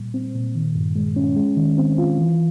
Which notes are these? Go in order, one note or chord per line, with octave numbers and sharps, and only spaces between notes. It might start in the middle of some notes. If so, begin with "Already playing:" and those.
Already playing: A#2 G3
C4
A#2
D#3
G2
G#3
C#4
G#3
D#3
C4
F4
E3